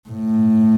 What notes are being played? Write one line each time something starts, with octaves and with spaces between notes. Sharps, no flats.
A2